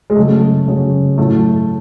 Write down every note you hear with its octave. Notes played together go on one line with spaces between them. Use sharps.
G#3
C#3 F#3 A3
C#3 F#3
A2 F#3 A3